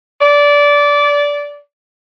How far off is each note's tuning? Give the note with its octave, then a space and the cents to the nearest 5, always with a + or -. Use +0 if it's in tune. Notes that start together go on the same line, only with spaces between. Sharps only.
D5 -20